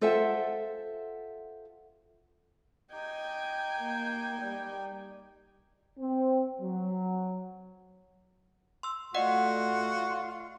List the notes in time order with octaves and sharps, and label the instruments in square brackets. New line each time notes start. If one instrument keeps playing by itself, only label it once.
[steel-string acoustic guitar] F4 A4 C5 E5 F#5 G5
[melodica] D#4 G4 [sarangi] D#5 [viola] G5 G#5
[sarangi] A#3
G3
[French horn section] C4
F#3
[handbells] C6 E6
[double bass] A3 [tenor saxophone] F4 [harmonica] F#4 [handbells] D5 D#5 F#5